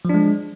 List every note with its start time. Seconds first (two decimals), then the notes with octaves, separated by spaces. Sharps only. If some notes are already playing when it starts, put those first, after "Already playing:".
0.05 F3
0.09 D4
0.14 G#3